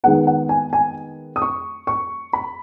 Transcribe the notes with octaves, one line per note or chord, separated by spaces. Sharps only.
D#3 G#3 B3 F#5
F#5
G#5
G#5
D#6
C#6
C#6
B5